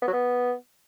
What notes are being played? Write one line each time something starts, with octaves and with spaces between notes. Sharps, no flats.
B3
F#3
B3